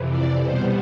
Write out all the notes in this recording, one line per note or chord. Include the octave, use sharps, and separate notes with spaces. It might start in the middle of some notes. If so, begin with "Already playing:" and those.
Already playing: F2 C3 E3
D5
B2 G3 B3 C5